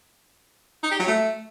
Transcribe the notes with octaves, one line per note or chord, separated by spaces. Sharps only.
D#4
G4
F#3
A3